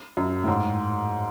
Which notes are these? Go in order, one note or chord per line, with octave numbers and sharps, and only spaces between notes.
F#2
A2
G#2